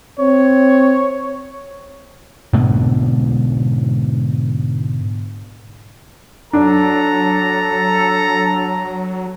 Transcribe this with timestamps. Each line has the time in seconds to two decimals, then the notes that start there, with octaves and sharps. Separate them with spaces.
0.19 C4 C#5
2.53 G#2 B2 D3 A3
6.53 F#3 D4 A4 A#5